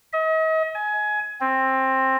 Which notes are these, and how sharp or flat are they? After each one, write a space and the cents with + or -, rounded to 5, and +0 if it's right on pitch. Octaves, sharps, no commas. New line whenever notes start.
D#5 +40
G#5 +20
C4 +15